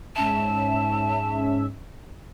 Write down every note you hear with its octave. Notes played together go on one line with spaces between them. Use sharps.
G#2 C#4 E5 A5